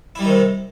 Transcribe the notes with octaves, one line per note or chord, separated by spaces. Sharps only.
C3 D#3 G3 D#4 E4